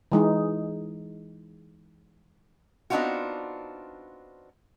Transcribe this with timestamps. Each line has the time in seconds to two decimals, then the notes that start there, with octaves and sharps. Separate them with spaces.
0.12 E3 G#3 D#4
2.90 B3 C4 D4 D#4 F4 F#4